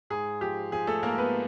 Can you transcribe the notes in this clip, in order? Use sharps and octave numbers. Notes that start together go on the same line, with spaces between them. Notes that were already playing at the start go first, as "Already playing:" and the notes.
G#2 G#4
F3 G4
F3 G#4
A3 A4
G#2 A#3 A#4
B3 B4